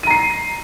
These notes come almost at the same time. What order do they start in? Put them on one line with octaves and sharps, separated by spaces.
D#7 A#5 C7